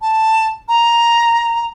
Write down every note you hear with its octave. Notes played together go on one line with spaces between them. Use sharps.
A5
A#5